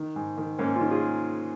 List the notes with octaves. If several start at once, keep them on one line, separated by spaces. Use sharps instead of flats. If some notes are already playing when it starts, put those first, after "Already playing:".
Already playing: D#3
G#2
D#3
G#2 A#3 C#4
C#4 F4
D#3
F4 G#4